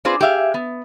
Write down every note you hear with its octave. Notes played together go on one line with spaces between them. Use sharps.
C4 F4 G#4 B4 C5 D5
G4 G#4 E5 F5
B3